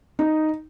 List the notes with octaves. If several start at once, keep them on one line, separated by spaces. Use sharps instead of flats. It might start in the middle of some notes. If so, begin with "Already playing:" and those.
D#4